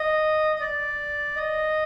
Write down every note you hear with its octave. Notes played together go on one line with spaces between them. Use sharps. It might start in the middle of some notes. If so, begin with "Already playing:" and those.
Already playing: D#5
D#5
D5
D#5